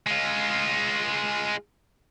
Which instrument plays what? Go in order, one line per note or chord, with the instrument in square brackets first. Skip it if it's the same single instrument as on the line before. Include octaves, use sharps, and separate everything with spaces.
[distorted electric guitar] G#3 F4